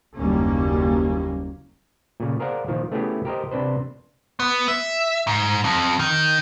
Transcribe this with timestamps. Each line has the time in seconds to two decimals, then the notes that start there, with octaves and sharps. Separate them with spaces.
0.15 F#1 D#2 G3 A#3 C#4
2.20 A#2 C#3
2.40 G#4 A#4 C5 D5 F5 F#5
2.68 A#2 D#3 F3
2.92 A3 B3 C#4 E4 G4 G#4
3.25 G4 A#4 C5 D#5
3.51 C3 C4 D4 B4 C5
4.40 B3
4.68 E5
5.27 G#2
5.64 F2
5.99 D#3